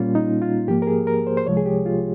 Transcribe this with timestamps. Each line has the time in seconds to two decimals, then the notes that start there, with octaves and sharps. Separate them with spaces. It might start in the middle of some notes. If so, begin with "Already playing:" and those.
Already playing: A#2 G3 A#3 C#4 F4
0.15 D#4
0.42 F4
0.68 G#2 F3 A#3 G4
0.82 A#4
0.87 G#4
1.07 A#4
1.27 C5
1.37 C5
1.46 C2 C3 F3 G#3 C#5
1.57 G#4
1.66 G4
1.86 F4